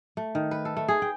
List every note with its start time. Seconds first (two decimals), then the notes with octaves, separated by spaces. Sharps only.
0.17 A3
0.35 D#3
0.51 B4
0.65 A4
0.77 A3
0.88 G#4
1.02 G5